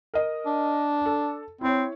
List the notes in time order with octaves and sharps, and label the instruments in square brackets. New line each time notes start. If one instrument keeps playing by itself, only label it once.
[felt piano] A#4 D#5
[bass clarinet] D4
[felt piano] A4
[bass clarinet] C4 [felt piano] E4 C#5